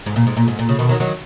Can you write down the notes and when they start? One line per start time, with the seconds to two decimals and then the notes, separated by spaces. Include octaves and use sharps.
0.06 G#2
0.16 A#2
0.27 G#2
0.37 A#2
0.48 G#2
0.59 A#2
0.69 C#3
0.79 B2 D#3
0.89 D#3 F#3
1.00 D#3 F#3